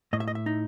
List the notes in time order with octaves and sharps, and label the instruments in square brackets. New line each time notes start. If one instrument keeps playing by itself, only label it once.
[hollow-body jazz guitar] A2 D#5
E5
D#5
E5
D#4